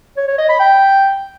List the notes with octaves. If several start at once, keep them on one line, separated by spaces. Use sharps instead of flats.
C#5
C#5
D#5
B5
G5